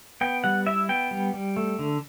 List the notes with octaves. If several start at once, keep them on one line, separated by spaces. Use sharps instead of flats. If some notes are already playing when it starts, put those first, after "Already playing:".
B3 G5
G3 F#5
E4 E5
B3 G5
G3
G3
A3
D3